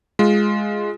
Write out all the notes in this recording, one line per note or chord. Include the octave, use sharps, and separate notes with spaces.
G#3 F4